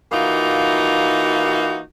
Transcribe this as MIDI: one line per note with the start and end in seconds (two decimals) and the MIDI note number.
0.11 1.79 52
0.11 1.79 58
0.11 1.79 63
0.11 1.79 65
0.11 1.79 66